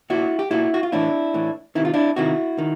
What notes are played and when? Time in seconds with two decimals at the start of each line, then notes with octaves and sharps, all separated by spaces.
0.10 A#2 E4 F#4
0.39 G4
0.51 A#2 E4 F#4
0.74 F#4
0.83 F4
0.92 A2 E3 D4 E4
1.34 A2 E3
1.75 C3 D#3 E4
1.85 F4
1.94 D4 E4
2.16 C3 D#3 E4 F#4
2.58 D#3